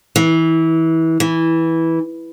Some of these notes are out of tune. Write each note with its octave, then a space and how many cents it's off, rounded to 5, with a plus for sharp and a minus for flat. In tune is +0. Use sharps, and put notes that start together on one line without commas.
E3 -25
E3 -10